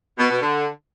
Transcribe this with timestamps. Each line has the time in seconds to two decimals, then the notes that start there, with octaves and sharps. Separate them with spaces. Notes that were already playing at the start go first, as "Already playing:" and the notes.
0.18 B2
0.30 B2
0.41 D3